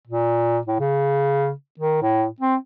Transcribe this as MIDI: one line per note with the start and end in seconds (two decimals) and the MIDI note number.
0.07 0.58 46
0.67 0.79 45
0.80 1.52 49
1.79 1.99 51
2.02 2.25 45
2.40 2.55 60